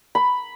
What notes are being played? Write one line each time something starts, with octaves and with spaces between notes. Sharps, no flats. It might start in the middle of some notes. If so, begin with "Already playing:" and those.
B5